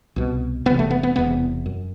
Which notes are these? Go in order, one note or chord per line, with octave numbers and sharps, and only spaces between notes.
C2 B2
E1 E2 C3 B3
A3
B3
B3
E1 E2 C3 B3
F#2